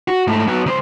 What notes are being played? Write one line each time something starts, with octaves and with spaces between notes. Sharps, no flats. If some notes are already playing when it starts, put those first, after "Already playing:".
F#4
G#2 A3
F#3 B3
C#2 C5